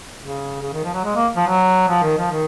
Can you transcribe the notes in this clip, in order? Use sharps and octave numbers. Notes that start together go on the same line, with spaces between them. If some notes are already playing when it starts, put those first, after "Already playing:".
C#3
C#3
D#3
F3
F#3
G#3
A#3
F3
F#3
F3
D#3
F3
D#3